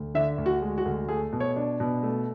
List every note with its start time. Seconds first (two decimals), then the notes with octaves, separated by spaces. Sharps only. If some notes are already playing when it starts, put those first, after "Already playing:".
Already playing: D2
0.14 D3 E5
0.38 D2
0.46 F#4
0.62 G#3
0.78 F#4
0.85 D2
1.09 A3 G#4
1.33 B2
1.40 C#5
1.56 D4
1.80 B2
2.03 A3